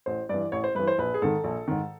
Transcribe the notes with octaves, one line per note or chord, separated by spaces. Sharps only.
A1 C5
G2 E3 D5
A1 C#5
C5
G2 E3 B4
C5
A#1 B4
G#4
G#2 D#3 A4
A#1
G#2 D#3